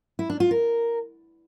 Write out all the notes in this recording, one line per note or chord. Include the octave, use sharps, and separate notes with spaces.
E4
D4
F4
A#4